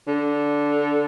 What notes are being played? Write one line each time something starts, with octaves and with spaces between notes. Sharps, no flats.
D3